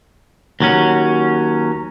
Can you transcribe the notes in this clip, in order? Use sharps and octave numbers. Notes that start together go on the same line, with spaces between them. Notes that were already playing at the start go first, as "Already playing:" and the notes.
D#2 F#3 C#4